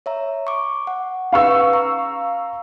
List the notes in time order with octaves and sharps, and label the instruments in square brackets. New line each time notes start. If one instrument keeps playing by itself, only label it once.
[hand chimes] C#5 E5 A#5
C#6 D6
F#5
[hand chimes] C#4 B4 [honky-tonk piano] F5 C#6 E6
[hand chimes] A#5